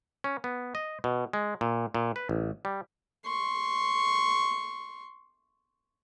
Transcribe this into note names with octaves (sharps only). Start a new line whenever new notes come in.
C#4
B3
D#5
B2
G#3
A#2
A#2
B4
A1
G3
C6 C#6